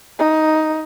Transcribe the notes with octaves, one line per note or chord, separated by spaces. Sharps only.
D#4